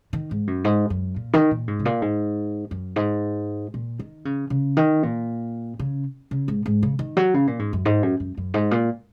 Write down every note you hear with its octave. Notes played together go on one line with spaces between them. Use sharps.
D#3
G#2
F#2
G#2
F#2
A#2
D#3
A#2
G#2
C#3
A#2
G#2
F#2
G#2
A#2
D#3
C#3
C#3
D#3
A#2
C#3
C#3
G#2
G#2
C#3
D#3
F#3
C#3
A#2
G#2
F#2
G#2
F#2
F#2
F#2
G#2
A#2